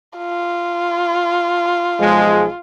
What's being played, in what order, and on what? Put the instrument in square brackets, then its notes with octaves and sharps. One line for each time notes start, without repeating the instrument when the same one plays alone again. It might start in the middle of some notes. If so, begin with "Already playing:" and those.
[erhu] F4
[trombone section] B1 F3 G#3